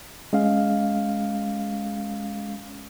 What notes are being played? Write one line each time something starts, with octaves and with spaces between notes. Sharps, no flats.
G#3 C#4 F5